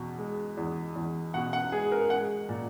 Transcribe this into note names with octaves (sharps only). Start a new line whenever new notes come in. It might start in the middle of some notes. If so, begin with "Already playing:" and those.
Already playing: E2 B2
G#3
E2
E2
B2 F#5
F#5
G#3 G#4
A#4
G#3 F#5
A#2